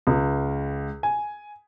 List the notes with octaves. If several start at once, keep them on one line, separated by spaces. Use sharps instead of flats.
C#2
G#5